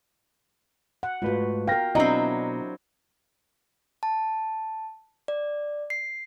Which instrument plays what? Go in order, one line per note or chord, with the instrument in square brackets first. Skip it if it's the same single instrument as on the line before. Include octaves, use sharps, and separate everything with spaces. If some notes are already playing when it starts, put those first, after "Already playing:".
[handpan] F#5
[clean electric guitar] G#2 A3 B4 [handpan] F4 F#4
[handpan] A#4 F5 [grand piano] G5 A#6
[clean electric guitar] B2 [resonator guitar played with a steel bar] F#3 C4 [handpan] D4 E4 [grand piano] D#5 A#5
[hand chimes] A5
D5
C7